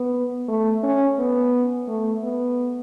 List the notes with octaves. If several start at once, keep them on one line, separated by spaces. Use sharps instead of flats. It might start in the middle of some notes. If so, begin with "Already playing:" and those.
Already playing: B3
A3
C#4
B3
A3
B3